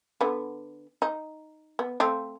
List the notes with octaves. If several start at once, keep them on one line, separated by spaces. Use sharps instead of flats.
D3 B3
D#4
B3
A3 C4 F5